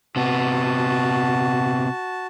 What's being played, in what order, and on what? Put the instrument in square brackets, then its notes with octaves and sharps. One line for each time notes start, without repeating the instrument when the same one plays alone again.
[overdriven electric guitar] C3 B3 [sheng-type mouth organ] F#4 A5